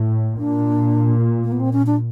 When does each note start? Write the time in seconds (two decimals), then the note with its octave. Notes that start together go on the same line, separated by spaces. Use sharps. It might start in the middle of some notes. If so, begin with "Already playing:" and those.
Already playing: A2
0.38 A#2 D4
1.44 A#3
1.52 B3
1.60 C4
1.73 C#4
1.86 D4